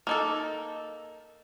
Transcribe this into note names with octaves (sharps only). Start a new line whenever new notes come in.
A#3 D#4 A4